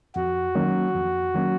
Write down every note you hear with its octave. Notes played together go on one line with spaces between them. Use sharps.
F2 F#4
D#3 F#3 A#3 C#4
F2
D#3 F#3 A#3 C#4